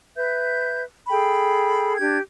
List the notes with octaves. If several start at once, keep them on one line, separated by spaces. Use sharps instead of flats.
B4 E5 G6
G#4 A4 G5 B5
D4 G4 G#6